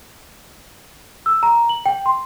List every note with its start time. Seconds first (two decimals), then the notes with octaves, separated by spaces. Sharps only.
1.26 E6
1.43 A#5
1.69 F#7
1.86 G5
2.06 C6